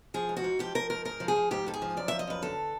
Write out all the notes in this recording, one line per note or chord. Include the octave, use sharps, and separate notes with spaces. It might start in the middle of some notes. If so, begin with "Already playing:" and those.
F3 G#4
G#2
F#4
G#2
F3 G4
F3 A#4
G#2 A#4
G#2 A#4
F3
G#4
F3
G#2 G4
G#2 A4
G#4
F3
F#2 D5
F3 E5
D#5
F#2 B4
D3 A4